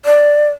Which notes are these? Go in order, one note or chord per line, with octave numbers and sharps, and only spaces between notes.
D5